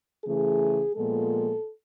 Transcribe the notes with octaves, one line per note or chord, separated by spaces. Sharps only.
C#3 E3 A3 G#4
A#2 F3 G#3 B3 A4